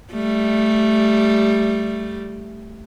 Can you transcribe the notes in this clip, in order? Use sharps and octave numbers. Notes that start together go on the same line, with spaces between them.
G3 A3